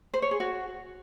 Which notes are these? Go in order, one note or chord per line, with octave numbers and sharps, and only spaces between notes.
C5
C#5
G#4
F#4